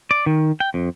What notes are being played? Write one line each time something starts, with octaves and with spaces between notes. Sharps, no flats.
D5
D#3
G5
F2